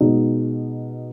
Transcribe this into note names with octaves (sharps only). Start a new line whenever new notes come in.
B2 G#3 D#4